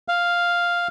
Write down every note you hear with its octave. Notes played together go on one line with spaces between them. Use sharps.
F5